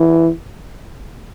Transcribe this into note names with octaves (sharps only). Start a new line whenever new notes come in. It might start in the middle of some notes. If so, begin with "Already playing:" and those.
Already playing: E3